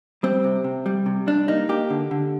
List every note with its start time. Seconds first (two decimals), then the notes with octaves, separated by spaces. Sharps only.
0.23 G3 C4
0.44 C3
0.64 C3
0.86 G3
1.06 C3
1.27 G3 D4
1.48 A#3 D#4
1.69 A#3 G4
1.90 D3
2.11 D3